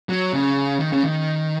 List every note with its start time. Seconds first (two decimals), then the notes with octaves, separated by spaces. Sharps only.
0.09 F#3
0.33 C#3
0.80 D#3
0.92 C#3
1.04 D#3